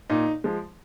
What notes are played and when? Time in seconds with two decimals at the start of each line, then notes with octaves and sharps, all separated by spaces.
0.10 A#2 D#4
0.44 F3 G#3